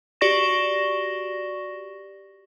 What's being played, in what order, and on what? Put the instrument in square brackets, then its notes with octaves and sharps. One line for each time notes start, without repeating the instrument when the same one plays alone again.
[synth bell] F#4 G4 D5 C#6 A#6 E7